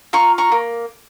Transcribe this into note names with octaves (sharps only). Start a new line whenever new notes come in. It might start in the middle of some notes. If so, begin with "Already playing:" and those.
F4 A#5 C#6
A#5 C#6
A#3